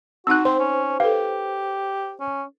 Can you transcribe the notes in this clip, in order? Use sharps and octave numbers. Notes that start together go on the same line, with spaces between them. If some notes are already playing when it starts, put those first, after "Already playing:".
C4 D#4 F#4 F#5 E6 F#6
C4 C5 C6
C#4
G4 A4 B4 F5
C#4